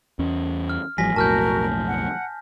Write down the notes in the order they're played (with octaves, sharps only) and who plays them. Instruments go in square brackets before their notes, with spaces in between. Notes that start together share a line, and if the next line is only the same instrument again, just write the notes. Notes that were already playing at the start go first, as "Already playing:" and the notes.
[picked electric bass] E2 C#4
[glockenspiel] F6
[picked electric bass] A1 F3 G3 [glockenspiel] G#5 A#6 B6
[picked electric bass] B1 F2 A2 [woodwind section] F#4 A#4 [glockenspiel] A5 F6 G6
[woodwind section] F#5